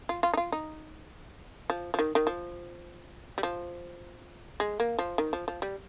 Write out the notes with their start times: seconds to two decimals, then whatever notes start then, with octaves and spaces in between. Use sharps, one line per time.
0.09 F4
0.23 F4
0.34 D#4
0.37 F4
0.52 D#4
1.70 F3
1.94 F3
1.99 D#3
2.15 D#3
2.27 F3
3.38 G3
3.43 F3
4.60 G#3
4.80 A#3
4.99 F3
5.18 D#3
5.33 F3
5.48 F3
5.62 G3